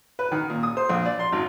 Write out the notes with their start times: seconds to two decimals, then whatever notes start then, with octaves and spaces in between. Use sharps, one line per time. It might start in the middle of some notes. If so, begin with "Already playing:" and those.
0.19 B4
0.32 D#3
0.50 A#2
0.63 D#6
0.77 C5
0.89 A#1
1.05 D5
1.19 C6
1.32 G#1